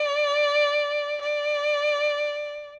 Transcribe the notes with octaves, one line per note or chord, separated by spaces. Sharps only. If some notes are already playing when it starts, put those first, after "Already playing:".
Already playing: D5
D5